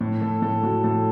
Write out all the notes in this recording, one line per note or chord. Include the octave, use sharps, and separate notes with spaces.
A2
A2 A4
A2 A4
A2 F#4
A2 A4